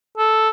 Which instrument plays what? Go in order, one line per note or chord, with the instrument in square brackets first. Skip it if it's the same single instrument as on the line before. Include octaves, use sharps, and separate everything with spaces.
[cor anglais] A4